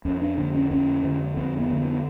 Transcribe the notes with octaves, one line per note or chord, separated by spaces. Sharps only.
F2 C#4
D4
D3 D4
C#4
F2 C#4
D3
F2 C4
B3
D3
A#3
B3